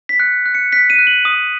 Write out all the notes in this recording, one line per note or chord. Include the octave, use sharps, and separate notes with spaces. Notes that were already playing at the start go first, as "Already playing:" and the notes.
B6
F#6 C#7
F#6
C#7
F#6 B6
D#7
F#6
F#7
D#6 D#7